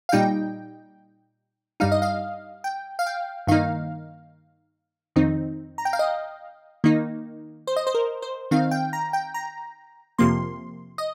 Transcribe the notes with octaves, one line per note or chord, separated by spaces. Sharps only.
F5
A#2 G3 D#4 G5
G2 G3 D#4 F5
D#5
F5
G5
F5
G5
G2 D#3 A#3 D#4 F5
F2 D#3 C4 D#4
A#5
G5
F5
D#5
D#3 A#3 D#4
C5
D#5
C5
A#4
C5
D#3 C4 D#4 F5
G5
A#5
G5
A#5
F2 C3 F3 A#3 C6
D#5